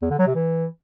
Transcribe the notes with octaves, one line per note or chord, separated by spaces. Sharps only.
E2
D3
F#3
C3
E3